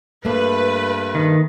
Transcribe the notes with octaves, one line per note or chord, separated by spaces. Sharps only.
G2 A3 A#3 B4
D#3